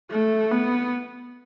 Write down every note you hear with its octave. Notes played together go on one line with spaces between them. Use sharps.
A3
B3